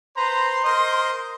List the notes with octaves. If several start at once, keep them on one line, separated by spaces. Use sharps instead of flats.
B4 C5 A#5 C6
A#4 C5 D#5